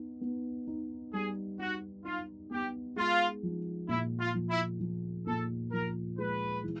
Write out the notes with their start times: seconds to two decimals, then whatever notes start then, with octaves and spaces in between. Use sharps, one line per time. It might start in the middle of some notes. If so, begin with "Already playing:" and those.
Already playing: B3 D#4
0.21 B3
0.67 D#4
1.13 G3 G#4
1.59 D#4 F#4
2.05 D#4 F4
2.51 B3 G4
2.96 G#3 F4
3.43 F3
3.88 A#2 E4
4.20 F4
4.34 F3
4.50 E4
4.80 F3
5.26 A#2 A4
5.72 F3 A#4
6.18 G#3 B4
6.64 E3